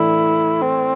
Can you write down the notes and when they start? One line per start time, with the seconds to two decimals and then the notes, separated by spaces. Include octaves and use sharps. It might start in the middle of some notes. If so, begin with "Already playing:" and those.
Already playing: A2 E3 A3 D4 E4
0.62 C4